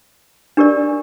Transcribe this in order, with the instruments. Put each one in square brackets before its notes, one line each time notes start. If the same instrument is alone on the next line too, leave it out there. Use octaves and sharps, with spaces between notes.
[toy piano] D4 G4 A#4 D5